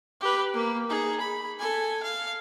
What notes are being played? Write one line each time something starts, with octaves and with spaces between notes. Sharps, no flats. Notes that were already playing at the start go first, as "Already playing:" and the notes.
G4 B4
A#3
D#4 G#4
B5
A4 G#5
F5